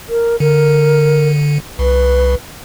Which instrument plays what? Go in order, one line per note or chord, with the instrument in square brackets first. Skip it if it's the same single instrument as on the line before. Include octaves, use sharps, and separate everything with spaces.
[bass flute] A#4
[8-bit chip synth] D3 [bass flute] A#4
[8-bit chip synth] C2 [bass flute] B4